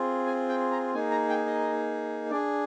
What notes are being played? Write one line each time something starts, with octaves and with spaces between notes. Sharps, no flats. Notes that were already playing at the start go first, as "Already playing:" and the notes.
Already playing: C4 F4 G#4
G#5
G5
A#5
A#3 D#4 G#4 G#5
A#5
G5
D#5
D4 G#4 D5